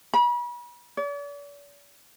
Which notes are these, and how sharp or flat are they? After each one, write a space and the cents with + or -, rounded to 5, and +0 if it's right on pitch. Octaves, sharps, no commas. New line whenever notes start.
B5 -40
D5 -45